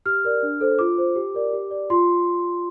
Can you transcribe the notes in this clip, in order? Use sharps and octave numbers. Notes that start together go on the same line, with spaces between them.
G4 F6
A#4 D5
D4
A4 C5
F4 D6
C5
G4
A#4 D5
G4
D5
F4 C6